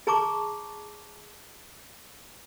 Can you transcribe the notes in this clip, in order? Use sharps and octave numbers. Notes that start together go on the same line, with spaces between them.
G#4 A5 A#5 C#6 D6